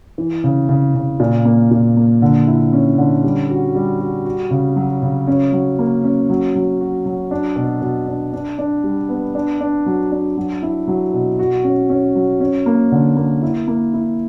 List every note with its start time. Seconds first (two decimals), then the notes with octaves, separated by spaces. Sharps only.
0.18 E3
0.44 C#3
0.69 C#3
0.94 C#3
1.20 A#2
1.45 A#3
1.71 A#2
1.97 A#3
2.22 D3
2.47 E4
2.73 C#4
2.98 D3
3.23 G3
3.50 F#4
3.75 G3
4.00 F#4
4.25 F#4
4.51 C#3
4.76 F#3
5.02 C#3
5.27 C#4
5.53 F#3
5.79 A#3
6.04 C#4
6.30 F#3
6.55 F#3
6.81 F#4
7.06 F#3
7.31 D4
7.56 B2
7.82 B2
8.07 D4
8.33 D4
8.59 D4
8.84 G3
9.09 B3
9.35 D4
9.61 D4
9.86 F#3
10.12 D4
10.37 F#3
10.63 E4
10.87 F#3
11.13 B2
11.39 F#4
11.64 C#4
11.90 C#4
12.15 F#3
12.40 C#4
12.66 A#3
12.92 D3
13.17 A#3
13.43 E4
13.68 A#3
13.94 E4